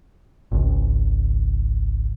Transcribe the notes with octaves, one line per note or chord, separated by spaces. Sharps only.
G#1 C#2